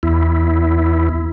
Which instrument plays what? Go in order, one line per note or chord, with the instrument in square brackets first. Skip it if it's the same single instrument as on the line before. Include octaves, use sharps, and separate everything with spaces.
[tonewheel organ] E2 E4